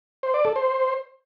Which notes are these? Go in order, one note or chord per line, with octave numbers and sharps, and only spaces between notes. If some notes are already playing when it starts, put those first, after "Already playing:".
C5
D5
A4
C5